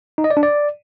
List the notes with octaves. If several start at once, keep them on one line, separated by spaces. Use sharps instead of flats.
D#4
D#5
D5
D4
D5